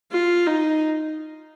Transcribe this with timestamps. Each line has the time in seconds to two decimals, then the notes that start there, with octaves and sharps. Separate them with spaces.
0.12 F4
0.47 D#4